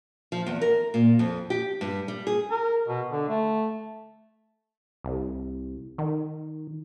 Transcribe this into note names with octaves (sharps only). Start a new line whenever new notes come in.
F3
E2
A#4
A#2
F2
G4
G2
G3
G#4
A#4
B2
D3
A3
C2
D#3